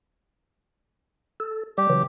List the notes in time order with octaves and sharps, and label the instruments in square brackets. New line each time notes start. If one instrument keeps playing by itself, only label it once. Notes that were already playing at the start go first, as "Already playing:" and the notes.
[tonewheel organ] A4
[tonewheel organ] G3 [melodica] G4
[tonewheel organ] C#3 E3 F#3